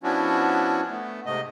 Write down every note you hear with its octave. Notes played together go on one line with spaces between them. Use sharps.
F3 B3 C#4 D4 E4 F#4
A3 B3
G#2 C3 A3 D#5